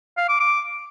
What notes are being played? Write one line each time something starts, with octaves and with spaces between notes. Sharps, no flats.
F5
D6
D6